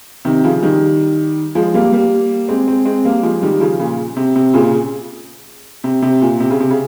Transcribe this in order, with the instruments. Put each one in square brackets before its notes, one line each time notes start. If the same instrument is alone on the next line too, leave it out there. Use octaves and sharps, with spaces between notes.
[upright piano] C3 D#3
C#3 F3
D#3 G3
F3 G#3
G3 A#3
G3 A#3
G#3 C4
G#3 C4
G#3 C4
G3 A#3
F3 G#3
D#3 G3
C#3 F3
A#2 C#3
C3
C3
A#2 C#3
C3
C3
A#2
C3
C#3
C3
C#3